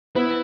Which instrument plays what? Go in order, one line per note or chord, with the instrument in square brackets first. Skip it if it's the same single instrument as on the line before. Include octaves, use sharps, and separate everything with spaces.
[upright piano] B3 [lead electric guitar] E4